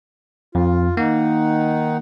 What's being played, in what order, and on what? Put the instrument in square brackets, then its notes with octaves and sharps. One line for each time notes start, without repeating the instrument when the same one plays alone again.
[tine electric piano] F2 [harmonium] F4
[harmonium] D#3 D#4 F#5 [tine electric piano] A#3